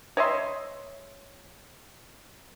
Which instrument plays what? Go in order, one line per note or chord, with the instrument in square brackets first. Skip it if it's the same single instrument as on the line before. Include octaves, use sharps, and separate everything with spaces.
[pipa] C#5 D#5 E5 C6